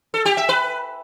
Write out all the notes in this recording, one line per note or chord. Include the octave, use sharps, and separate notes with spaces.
A4
G4
E5
B4